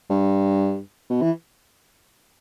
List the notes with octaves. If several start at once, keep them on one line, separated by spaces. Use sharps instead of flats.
G2
B2
E3